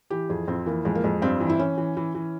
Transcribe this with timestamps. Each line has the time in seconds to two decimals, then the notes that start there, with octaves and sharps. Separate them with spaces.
0.10 E3 G4
0.29 F2 G#4
0.48 F2 C4
0.66 E3 A#3
0.85 F2 G#3
0.95 A#3
1.04 F2 G#3
1.22 G2 C4
1.41 E3
1.49 E4
1.59 E3 C#4
1.78 E3
1.97 E3
2.15 E3